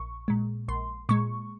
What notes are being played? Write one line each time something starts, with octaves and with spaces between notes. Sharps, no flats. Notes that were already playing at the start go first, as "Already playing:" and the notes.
Already playing: A#1 C#6
A#2 G#3
A#1 C6
A#2 G#3 C#6